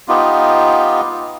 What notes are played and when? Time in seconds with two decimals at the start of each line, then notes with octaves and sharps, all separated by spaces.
0.08 B3 D#4 F4 G4